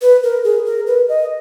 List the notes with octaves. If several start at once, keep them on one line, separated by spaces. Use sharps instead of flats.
B4
A#4
G#4
A#4
B4
D#5